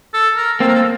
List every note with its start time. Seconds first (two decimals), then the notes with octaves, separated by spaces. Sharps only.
0.14 A4
0.36 A#4
0.60 A#3 C4 A4
0.68 A#4
0.75 A4